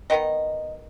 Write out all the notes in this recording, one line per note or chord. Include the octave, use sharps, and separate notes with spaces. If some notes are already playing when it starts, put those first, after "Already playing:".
D#3 B3 D#4 D#5